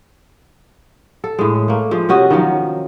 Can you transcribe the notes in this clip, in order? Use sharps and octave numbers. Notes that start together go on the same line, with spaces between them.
A4
A2 G#3
A3 A#3
F3 G#3
C3 C#4 F#4 D#5
D#3 F3 F#3